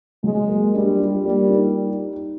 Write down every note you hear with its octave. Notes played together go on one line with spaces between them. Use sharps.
F#3 G#3
A#3
G3 D4
F4
G3 A#3
D#4